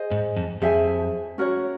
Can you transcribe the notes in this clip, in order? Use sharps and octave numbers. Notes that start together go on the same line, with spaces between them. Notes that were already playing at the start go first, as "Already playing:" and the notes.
Already playing: G#4 C5 D#5 G#5
G#2
F2
F2 G#4 C5 E5 G#5
C#4 F#4 A#4 C#5